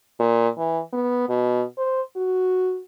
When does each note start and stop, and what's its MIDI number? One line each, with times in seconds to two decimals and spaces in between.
0.19 0.48 46
0.57 0.80 52
0.93 1.29 59
1.29 1.63 47
1.78 2.01 72
2.16 2.80 66